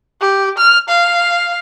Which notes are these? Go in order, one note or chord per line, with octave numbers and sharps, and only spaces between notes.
G4
F6
F5